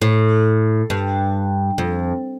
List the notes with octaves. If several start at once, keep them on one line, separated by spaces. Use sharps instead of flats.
A2
G2
F2